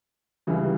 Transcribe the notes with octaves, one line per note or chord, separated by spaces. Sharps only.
C#2 C#3 E3 G3